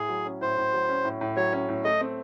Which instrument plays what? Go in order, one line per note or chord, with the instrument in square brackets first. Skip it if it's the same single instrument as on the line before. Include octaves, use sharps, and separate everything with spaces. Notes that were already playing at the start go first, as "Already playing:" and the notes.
Already playing: [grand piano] A2 [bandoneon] G#4
[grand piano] F#3
C#4
[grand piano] A2 [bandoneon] C5
[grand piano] A2
F#3
C#4
A2
A2
[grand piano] F#3 [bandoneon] C#5
[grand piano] C#4
A2
[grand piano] A3 [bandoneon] D#5
[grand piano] C4